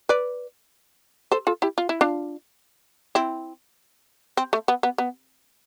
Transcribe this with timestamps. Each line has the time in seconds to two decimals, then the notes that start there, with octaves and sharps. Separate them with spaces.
0.09 B4 D5
1.32 A4 C5
1.47 F4 A4
1.62 E4 G4
1.78 F4
1.89 E4
2.01 D4 F4
3.15 C4 E4
4.37 C4
4.53 A3
4.68 B3
4.83 B3
4.98 B3